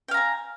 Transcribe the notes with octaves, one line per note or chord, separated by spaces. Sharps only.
F5 G5 G#5 A#5